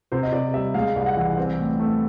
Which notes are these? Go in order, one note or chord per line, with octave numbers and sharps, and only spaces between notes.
C3 C5
D#5
C3 D5
G3 E5
G#3 F5
C2
F#5
E3
C4
A2
A3